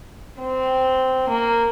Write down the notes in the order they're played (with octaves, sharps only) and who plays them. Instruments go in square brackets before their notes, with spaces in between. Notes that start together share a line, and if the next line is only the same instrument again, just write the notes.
[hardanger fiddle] C4
A#3